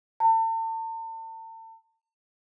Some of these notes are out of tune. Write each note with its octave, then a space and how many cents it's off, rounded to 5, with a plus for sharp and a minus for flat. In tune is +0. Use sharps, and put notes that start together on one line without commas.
A5 +40